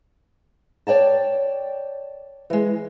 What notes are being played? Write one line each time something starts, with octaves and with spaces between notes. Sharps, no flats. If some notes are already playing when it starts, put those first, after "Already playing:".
C#5 D5 G5 A5
E3 G#3